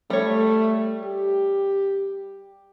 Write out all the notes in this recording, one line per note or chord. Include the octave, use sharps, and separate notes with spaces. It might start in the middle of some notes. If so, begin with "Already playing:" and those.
G3 A3 C#5
G4